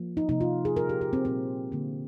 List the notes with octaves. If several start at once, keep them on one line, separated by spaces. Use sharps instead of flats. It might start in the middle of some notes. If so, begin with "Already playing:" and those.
Already playing: F3 A#3
D#4
C3 F3 A#3 D#4
F4
G#4
A#2 G3 A#3 A#4
G4
G4
C4
A#2 G3 A#3 C4
D3 F3 A#3